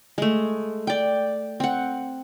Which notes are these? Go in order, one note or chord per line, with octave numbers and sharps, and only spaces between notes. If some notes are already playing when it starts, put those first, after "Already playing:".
G#3 A3
D5 G5
C4 F#5